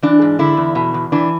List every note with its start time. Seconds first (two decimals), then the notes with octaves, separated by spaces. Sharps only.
0.03 E3 D4
0.22 G#2
0.39 D3 E4
0.57 E2
0.75 B2
0.94 E2
1.12 E3 D4